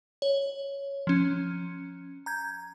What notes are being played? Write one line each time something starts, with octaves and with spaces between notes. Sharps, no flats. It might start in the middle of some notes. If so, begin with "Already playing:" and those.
C#5
F3 C#4
A#5 G6 G#6